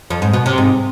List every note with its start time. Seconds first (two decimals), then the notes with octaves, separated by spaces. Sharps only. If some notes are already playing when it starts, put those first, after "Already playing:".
0.10 F2
0.22 G#2
0.33 B2
0.46 C3
0.58 G#2